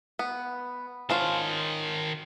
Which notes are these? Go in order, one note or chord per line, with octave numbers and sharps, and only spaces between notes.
B3
D#3 C#4 F4 C5 A5